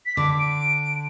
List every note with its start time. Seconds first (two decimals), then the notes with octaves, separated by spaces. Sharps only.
0.06 B6
0.17 D3 D6
0.39 D7